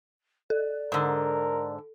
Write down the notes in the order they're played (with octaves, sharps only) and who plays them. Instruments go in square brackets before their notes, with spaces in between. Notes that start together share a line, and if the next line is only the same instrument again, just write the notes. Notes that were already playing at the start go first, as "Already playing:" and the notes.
[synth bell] A4 [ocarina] D5
[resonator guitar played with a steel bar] G#2 D3 [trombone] A#4